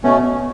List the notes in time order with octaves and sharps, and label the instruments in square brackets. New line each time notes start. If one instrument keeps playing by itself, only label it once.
[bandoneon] B2 A3 C#4 [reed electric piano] B3